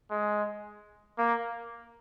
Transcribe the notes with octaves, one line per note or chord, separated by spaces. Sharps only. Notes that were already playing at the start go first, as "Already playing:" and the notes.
G#3
A#3